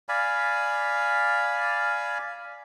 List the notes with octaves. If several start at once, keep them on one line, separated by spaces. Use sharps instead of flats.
D5 F5 G#5 B5